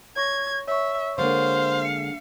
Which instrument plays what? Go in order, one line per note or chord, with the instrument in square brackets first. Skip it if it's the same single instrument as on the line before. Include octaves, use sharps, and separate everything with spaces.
[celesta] C#5 C#6 A#6 [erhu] G#6
[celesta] C#5 C#6 [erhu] E5
[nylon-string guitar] D3 G#3 A#3 [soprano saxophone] C5 [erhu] F5
[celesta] C7 C#7